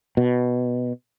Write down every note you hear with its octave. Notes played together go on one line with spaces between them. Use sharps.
B2